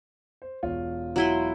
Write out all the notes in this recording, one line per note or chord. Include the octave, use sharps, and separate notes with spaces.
C5
E1 F4 C#5
F#3 E4 C6